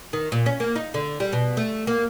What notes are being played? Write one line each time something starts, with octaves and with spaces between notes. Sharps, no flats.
D#3
A#2
C#4
A#3
D#4
D3
G3
B2
A3
A#3